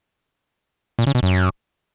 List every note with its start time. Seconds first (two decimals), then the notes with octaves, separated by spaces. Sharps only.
0.99 A#2
1.07 C#3
1.15 B2
1.23 F#2